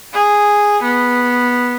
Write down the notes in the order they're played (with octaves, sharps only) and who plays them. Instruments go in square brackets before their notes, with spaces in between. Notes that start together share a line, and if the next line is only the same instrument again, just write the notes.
[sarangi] G#4
B3